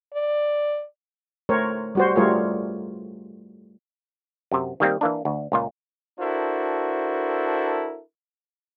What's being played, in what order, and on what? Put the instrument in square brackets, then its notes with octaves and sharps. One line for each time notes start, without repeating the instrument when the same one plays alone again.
[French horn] D5
[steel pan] A3 A#4 C5 C#5
G3 F#4 C5
G3 A3 F4 G#4 A#4 C#5
[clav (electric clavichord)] F#2 C3
D#3 G3 A#3 C4
E3 A#3 D4
D2
C#2 A#2 F4
[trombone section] D4 E4 F#4 A4 A#4 C5